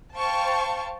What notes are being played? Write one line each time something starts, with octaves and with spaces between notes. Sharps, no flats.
C5 F5 G5 A5 C#6